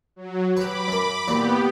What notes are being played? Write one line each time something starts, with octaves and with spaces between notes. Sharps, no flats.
F#3
G4 B4 B5 D6
F#2 A#4
A#2 E3 B3 D4 G4